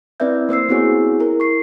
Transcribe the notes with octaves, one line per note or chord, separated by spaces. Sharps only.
C4 E4 B4 D5 E5 G6
A#3 C5 E6 C7
B3 C4 E4 F#4 G#4 C#5
E4 A#4
C#6 C7